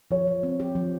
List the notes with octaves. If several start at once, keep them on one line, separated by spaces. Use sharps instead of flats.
F3 C#5
F3
C4
G4
F3